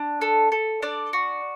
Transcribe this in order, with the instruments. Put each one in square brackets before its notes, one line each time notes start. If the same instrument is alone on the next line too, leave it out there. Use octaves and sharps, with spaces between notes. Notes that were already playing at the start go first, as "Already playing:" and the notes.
Already playing: [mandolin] D4
A4
A4
D4 D5
F#4